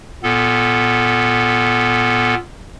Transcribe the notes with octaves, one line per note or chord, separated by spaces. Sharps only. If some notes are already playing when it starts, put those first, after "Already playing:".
A#2 B3 A4